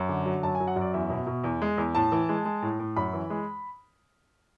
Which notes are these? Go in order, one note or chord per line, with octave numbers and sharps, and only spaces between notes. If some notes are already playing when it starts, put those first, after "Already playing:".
Already playing: F#2
D3
F#3
F#2 A5
G#5
F#3
F#5
F#2 D5
E2 E5
B2
B2
E2
G#3
E2
A2 A5
E3
G#3
G#3
A2
A2
F#2 B5
E3
G#3